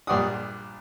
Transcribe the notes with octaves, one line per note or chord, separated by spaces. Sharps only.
A#1 G2 D5 F#5 D#6